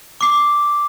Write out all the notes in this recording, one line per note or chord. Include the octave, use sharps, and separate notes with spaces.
D6 C7